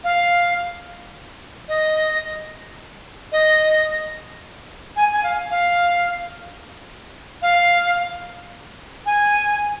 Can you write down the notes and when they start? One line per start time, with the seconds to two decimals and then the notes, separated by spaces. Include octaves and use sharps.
0.04 F5
1.68 D#5
3.32 D#5
4.97 G#5
5.14 G#5
5.23 F5
5.51 F5
7.42 F5
9.06 G#5